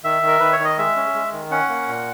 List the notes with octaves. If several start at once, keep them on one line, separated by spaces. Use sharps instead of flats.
D#3 E5
D#3
A#4
D#3 B4
C#5
D#3
D#5
G#3 E5
C#4
G#3
D#3
C#4 F#5
A#3
A#2